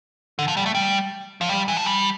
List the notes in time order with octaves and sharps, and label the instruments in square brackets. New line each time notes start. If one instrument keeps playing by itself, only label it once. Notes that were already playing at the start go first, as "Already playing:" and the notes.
[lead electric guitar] D3
F3
G3
A3
G3
F3
G3
E3
F3
G3